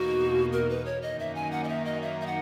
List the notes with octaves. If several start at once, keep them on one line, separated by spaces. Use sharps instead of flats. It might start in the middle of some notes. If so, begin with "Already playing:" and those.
Already playing: E2 B2 A#3 D#4 F#4
A#4
B4
C#5
F#2 D#3 A#3 D#4 D#5
E5
G#5
F#5
D#5
E5
D#5
E5
E5
F#5